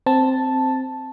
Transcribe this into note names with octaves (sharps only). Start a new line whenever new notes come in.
C4 A5